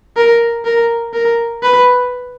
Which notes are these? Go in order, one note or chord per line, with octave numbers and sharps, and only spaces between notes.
A#4
A#4
A#4
B4